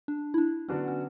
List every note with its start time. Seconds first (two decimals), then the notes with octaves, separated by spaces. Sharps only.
0.08 D4
0.34 E4
0.38 D4
0.68 D3 F#3 B3 C#4 D4 F#4
0.88 C#4